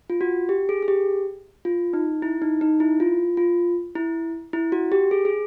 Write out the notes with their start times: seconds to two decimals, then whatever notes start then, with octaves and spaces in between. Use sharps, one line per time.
0.10 F4
0.21 F#4
0.49 G4
0.69 G#4
0.83 G#4
0.88 G4
1.65 F4
1.93 D#4
2.22 E4
2.42 D#4
2.61 D#4
2.80 E4
3.00 F4
3.37 F4
3.96 E4
4.53 E4
4.72 F#4
4.92 G4
5.11 G#4
5.25 G#4